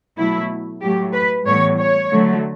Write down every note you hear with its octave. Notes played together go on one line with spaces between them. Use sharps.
B2 F#3 A3 E4
A2 F#3 A3 G4
B4
A2 E3 G3 B3 C#5
C#5
D3 F#3 A3